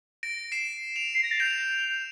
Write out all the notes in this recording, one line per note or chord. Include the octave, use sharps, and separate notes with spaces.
A#6 D7
C7 E7
D7 F7
C7
A#6
A6
G6 D7 F7